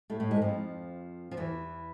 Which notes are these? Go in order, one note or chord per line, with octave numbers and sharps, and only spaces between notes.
A2 A3
A2 A3
G#2 G#3
F2 F3
F3
E2 E3